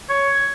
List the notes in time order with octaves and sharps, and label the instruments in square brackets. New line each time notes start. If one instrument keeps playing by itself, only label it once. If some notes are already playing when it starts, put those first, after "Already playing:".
[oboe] C#5